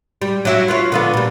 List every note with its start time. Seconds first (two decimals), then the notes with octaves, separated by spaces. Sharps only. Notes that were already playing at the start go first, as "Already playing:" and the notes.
0.22 G3
0.45 F#3 E4
0.68 F4 B4 C#5
0.92 D3 F3 B3
1.14 A#2 G3